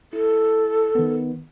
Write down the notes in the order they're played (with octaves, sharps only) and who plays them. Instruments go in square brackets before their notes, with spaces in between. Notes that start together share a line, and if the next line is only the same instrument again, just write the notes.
[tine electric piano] E4 [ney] A4
[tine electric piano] D#3 B3